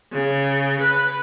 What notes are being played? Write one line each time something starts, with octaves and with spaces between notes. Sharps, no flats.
C#3
B4